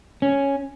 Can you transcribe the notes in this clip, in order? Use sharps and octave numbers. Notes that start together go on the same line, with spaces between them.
C#4